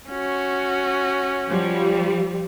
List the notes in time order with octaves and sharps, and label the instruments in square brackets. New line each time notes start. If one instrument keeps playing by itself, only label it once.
[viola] C#4 F#4
[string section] F3 G3